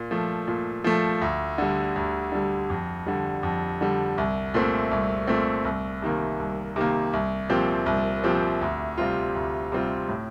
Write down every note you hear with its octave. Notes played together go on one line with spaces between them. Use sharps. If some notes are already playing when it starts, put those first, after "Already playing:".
Already playing: A#2
F3 A3
A#2
F3 A3
D2
D3 G3
D2
D3 G3
F2
D3 G3
F2
D3 G3
C2
A#2 A3 C4
C2
A#2 A3 C4
C2
C3 D#3 A#3
C2
C3 D#3 A#3
C2
A#2 F3 C4 G4
C2
A#2 F3 C4 G4
D2
C3 G3 C4 F4
D2
C3 G3 C4 F4
A2